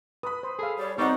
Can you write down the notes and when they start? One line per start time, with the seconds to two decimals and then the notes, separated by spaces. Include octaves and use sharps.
0.23 B4 B5 D#6
0.43 C5
0.59 G#4 A4 F5
0.79 G3 C#5
0.98 G3 B3 C4 D#4 F#5 A#5 C#6